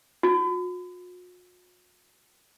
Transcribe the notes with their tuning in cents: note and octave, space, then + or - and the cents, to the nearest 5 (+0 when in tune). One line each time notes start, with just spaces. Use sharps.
F#4 -45